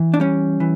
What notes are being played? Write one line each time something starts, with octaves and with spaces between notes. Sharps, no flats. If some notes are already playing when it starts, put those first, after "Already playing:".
Already playing: E3
D4
G3 C#4
E3